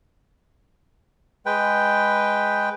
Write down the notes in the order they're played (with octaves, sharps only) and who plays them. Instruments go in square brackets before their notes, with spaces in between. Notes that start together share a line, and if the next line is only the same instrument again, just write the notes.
[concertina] G#3 B4 G5